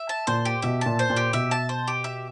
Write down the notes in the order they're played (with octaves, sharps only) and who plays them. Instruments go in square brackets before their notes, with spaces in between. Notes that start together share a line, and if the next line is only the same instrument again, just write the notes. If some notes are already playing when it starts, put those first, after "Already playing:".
Already playing: [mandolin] E5
A5
[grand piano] A#2 [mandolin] C5
[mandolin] G4
[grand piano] B2 [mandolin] E5
[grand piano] A#2 [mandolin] A5
[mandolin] C5
[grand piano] A#2
[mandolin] G4
[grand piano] B2 [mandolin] E5
[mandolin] A5
C5
G4
E5